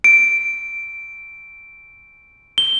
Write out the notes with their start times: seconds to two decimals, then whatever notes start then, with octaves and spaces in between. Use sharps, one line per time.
0.04 D7
2.58 G7